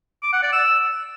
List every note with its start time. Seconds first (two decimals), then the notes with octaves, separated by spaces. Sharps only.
0.23 D6
0.33 F#5
0.43 D5
0.53 E6